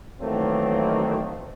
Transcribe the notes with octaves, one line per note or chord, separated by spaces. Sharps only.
D#3 E3 F#3 A3 A#3 C4